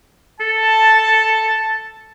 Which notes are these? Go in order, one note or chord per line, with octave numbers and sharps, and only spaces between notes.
A4 A5